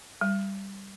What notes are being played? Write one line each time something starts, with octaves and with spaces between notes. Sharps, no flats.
G3